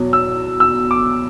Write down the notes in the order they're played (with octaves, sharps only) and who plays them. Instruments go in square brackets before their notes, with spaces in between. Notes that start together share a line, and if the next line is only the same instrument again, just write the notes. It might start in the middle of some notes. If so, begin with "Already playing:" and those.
Already playing: [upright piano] E2 B2 F#3
[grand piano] E6
E6
D6